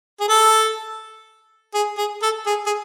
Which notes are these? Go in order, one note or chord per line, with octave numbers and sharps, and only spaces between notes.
G#4
A4
G#4
G#4
A4
G#4
G#4